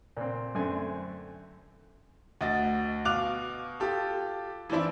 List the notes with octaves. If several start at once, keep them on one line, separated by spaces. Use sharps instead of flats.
A#2 C4
F#2 D3 A3 C4 G#5
D2 F#4 D#5 A6
B2 F5 D6 F#6 F7
F4 G4 A4
E3 F3 C4 D4 E4